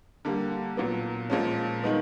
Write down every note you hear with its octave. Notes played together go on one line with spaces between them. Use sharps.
D3 G3 A#3
A#2 F#3 B3
A#2 F3 G#3 C#4
D#3 G#3 B3 D#4